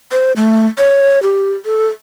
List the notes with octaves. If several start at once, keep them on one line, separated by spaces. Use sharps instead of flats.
C5
A3
C#5
G4
A4